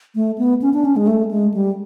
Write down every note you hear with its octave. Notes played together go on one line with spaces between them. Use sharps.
A3
B3
C#4
D4
C#4
G#3
A3
G#3
G3